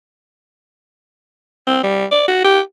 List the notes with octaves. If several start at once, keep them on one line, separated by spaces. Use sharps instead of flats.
C4
G3
D5
F#4
G4